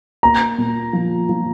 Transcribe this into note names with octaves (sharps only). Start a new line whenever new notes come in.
A#3 A#5
A#2
F3
F3